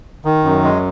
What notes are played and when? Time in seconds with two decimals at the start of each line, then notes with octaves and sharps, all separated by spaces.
0.25 D#3
0.44 F#2
0.63 G#3